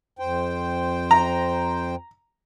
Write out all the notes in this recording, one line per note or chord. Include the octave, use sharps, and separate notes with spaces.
F2 C5 G5
A#5